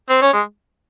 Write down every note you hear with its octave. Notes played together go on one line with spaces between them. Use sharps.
C4
C#4
G#3